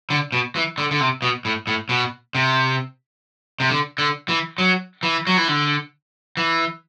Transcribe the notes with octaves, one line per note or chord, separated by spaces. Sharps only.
D3
B2
E3
D3
D3
C3
B2
A2
A2
B2
C3
C3
D3
D3
E3
F#3
E3
F#3
E3
D3
E3